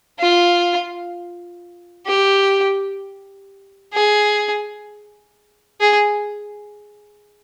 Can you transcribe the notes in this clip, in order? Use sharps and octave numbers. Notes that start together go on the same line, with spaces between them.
F4
G4
G#4
G#4